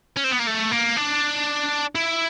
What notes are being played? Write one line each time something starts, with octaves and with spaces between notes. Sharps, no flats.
C#4
C4
B3
A#3
A3
A#3
D4
E4